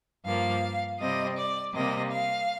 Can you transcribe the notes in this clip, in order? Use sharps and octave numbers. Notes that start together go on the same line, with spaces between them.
G2 F3 A#3 F5
C3 G3 C4 D#5
D5
C3 G3 A#3 D#5
F5